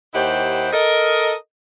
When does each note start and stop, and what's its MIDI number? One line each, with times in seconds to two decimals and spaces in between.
0.14 0.71 39
0.14 0.71 63
0.14 0.71 64
0.14 0.71 67
0.14 0.71 72
0.14 0.71 78
0.73 1.34 69
0.73 1.34 70
0.73 1.34 75